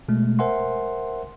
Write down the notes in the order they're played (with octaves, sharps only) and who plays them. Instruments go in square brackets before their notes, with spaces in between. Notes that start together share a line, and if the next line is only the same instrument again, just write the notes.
[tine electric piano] B2 G#3 A3
A#4 C5 E5 F#5 G#5 C6